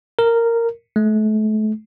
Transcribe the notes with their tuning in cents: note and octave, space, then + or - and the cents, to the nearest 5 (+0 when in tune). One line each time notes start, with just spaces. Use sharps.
A#4 -10
A3 -35